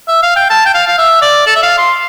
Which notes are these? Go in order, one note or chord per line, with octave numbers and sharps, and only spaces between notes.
E5
F5
G5
A5
G5
F5
F5
E5
D5
A4
E5
F5
C6